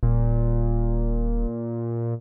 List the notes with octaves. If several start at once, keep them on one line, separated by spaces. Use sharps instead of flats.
D#1 A#2